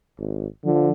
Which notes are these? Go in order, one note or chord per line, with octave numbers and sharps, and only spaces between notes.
G#1
D3 F3